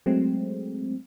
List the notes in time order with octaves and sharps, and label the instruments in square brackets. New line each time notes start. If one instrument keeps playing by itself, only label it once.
[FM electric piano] F#3 G#3 A3 C4